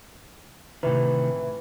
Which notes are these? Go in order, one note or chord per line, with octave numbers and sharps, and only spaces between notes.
A2 C3 D#3 E3 B4